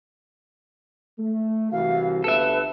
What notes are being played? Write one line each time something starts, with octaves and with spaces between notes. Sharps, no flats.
A3
C2 E3 F#4 F5
G1 A4 B4 E5